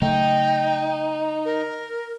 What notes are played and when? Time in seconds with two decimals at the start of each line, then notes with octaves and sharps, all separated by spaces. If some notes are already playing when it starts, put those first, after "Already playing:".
0.02 C#3 F#3 A3 D#4 G5
1.45 A#4